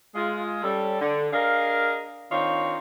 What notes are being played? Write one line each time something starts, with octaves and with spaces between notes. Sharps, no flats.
G#3 F4 G#4
G3 C#4 A4
D3
D4 G#4 A#4 D#5 F5
D#3 C4 D4 D#4 F4 C#5